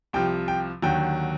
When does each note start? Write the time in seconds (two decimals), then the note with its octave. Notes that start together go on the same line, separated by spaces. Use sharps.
0.13 C2 C3 F3 G5
0.48 G5
0.82 D#2 D3 F#3 G5